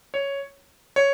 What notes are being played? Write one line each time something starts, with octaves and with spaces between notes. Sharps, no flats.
C#5
C#5